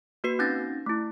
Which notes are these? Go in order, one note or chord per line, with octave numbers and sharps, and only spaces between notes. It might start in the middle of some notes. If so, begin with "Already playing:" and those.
A#3 F#4 B4 C7
C4 C#4 D#4 G6 A6 A#6
A3 E4